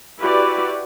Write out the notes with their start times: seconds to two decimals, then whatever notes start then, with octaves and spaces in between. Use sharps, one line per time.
0.19 E4 F#4 G4 B4 D5